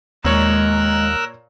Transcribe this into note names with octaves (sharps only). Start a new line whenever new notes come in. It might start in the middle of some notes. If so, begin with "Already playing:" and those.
D#2 A#2 G#3 A#4 C#5 C#6 E6 F#6